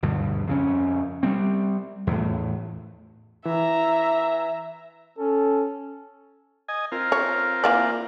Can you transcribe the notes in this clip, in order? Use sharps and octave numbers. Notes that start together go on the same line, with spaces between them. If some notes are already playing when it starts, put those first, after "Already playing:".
D2 G2 B2
F2 C#3 C#4
G3 A3 C4
E2 A2
E3 E5 A#5
C#4 A4
D#5 G#5
C4 F4 A#4
C#5
E3 A#3 D5